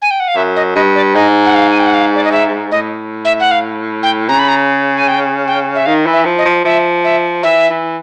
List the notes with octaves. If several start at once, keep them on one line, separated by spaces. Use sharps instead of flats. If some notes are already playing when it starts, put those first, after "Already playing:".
G#5
G5
F#5
F5
F#2 E5
D#5
G2 D#5
D5
G#2 D#5
F#5
F5
G#5
G5
F#5
F5
D5
D#5
E5
A2 D#5
E5
F#5
F5
G5
C#3 A#5
B5
A#5
G#5
G5
G5
E5
D#3 F5
E3
E5
F3
D#5
F3
F3 E5
E5
E3 E5
E3